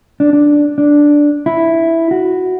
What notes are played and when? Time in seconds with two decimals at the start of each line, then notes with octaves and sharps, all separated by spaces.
0.20 D4
0.33 D4
0.78 D4
1.46 E4
2.11 F#4